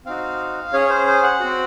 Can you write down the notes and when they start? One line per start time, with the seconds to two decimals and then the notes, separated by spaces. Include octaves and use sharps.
0.06 C4 D#4 F#4 F5
0.73 C#4 G#4 C#5
0.90 C5
1.07 C5
1.23 F#5
1.40 C4 F#4